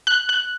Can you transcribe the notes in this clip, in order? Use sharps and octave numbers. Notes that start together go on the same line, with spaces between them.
F#6
F#6